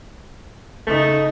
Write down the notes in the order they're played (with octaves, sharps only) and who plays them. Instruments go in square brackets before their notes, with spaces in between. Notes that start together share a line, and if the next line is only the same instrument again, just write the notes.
[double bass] C#3 D#4 [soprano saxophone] A3